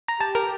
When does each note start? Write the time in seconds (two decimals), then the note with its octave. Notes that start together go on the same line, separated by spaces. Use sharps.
0.08 A#5
0.20 G4 A5
0.35 A#4